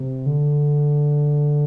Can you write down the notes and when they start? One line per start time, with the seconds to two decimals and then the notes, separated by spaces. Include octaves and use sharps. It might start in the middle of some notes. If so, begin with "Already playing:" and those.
Already playing: C3
0.26 D3